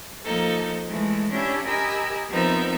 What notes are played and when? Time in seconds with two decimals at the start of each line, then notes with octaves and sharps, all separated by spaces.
0.24 F3 A#3 D#4 A4
0.88 E3 G#3 A3
1.32 C#4 D4 E4 G4
1.67 G4 A#4 D#5 G#5 B5 E6
2.31 F3 B3 C4 D#4 A#4 E5